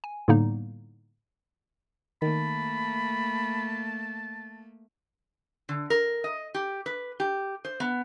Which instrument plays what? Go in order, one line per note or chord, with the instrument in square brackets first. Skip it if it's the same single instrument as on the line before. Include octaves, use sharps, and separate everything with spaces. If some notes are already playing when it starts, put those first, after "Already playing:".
[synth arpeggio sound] G#5
A2 D3 G3 A#3 B3 D#4
[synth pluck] D#3 [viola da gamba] A3 A#3 [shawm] A5 [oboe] B5
[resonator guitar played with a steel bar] D3
A#4
D#5
G4
B4
G4
C5
B3